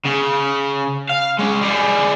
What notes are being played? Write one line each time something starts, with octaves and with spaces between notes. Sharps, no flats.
C#3
F5
G#3 C#4
G3 G#4